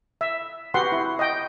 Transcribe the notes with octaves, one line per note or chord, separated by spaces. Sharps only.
E5
F#4 G4 B4 F#5 C6
E4
D#5 G5